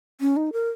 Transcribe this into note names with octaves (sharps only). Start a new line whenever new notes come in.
C#4
D#4
A#4